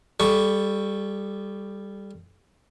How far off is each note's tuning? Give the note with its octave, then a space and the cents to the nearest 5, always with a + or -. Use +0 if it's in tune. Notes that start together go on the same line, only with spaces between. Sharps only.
G3 +10 A4 -20 C#6 +0